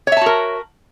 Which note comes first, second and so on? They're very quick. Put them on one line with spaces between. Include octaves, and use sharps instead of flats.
C#5 E5 A5 F#4 A#4